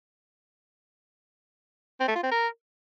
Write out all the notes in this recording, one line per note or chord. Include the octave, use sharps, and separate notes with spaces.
C4
A3
F4
C4
A#4